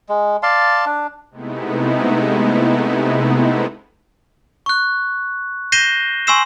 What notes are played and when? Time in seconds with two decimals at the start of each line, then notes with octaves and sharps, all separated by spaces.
0.09 G#3
0.43 D5 F5 A5 C6
0.86 D4
1.30 C3 G#3 A3 B3 D#4 E4
4.66 C#6 F#6
5.72 G6 A#6 C7 D#7 E7 G7
6.27 G#5 C6 C#6 E6 C7 E7